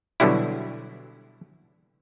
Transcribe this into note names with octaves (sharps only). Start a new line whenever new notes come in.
B2 D3 F#3 G3 E4